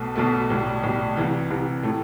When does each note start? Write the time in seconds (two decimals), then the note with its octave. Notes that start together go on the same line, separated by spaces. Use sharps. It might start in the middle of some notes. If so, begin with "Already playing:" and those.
Already playing: B1 B2 A3
0.16 B1 B2 A3
0.50 B1 A2 G3
0.83 B1 A2 G3
1.17 C2 C3 E3
1.50 C2 C3 E3
1.83 A2 E3 A3